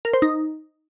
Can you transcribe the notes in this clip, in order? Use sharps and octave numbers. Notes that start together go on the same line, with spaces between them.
A#4
C5
D#4